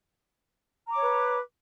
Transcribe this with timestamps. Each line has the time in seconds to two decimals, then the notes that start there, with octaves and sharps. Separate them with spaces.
0.86 A#5
0.91 D6
0.96 C#5
1.01 B4